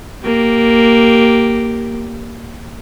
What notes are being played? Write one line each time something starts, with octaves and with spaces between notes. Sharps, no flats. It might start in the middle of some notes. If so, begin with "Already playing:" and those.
A#3 G4